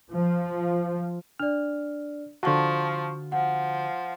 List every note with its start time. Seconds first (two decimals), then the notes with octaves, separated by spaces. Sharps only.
0.13 F3
1.40 D4 D5 F6
2.43 D3 F3 F#4 A5 C#6
3.32 F3 F#5